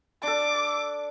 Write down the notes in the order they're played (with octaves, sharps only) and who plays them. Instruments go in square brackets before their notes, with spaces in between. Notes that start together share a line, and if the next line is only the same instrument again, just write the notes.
[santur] D4 A4 [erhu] D6